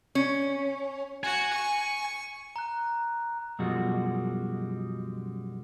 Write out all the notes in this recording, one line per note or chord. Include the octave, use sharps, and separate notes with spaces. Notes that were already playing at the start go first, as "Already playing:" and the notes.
C#4
F#4 G#5
C#6
A#5 F#6
F#2 B2 F3 G3 G#3 F#4